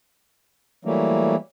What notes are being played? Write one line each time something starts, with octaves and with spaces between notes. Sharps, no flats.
E3 F#3 G3 A3 A#3